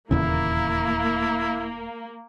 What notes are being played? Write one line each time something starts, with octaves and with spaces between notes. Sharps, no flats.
D#1 E2 C#3 A#3 E4